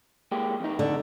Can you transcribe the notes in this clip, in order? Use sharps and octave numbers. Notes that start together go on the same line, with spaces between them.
G#3 A#3 G4
F2 D#4
D3